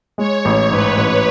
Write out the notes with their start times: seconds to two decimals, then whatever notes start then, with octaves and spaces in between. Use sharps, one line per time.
0.18 G#3 C#5
0.45 A1
0.71 G#2 B4
0.97 A1